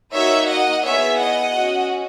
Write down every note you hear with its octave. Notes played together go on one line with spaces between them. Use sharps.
A#3 D#4 F#4 C#5 E5
D#5 F#5
B3 E4 G#4 C#5 E5
D#5 F#5
C#4 F#4